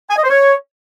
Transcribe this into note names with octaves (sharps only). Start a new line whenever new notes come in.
G#5
D#5
C5
C#5